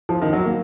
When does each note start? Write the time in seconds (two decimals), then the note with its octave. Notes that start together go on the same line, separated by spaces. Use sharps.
0.09 F3
0.22 D#3
0.33 F#3
0.44 A#3